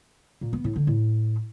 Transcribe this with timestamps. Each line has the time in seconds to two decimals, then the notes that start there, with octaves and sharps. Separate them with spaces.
0.41 A#2
0.53 B3
0.64 A2
0.76 D3
0.87 A2